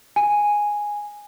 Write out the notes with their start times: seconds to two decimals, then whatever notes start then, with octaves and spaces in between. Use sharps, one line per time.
0.16 G#5